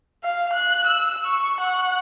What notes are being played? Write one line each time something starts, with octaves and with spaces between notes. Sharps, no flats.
F5
F#6
E6
C#6
F#5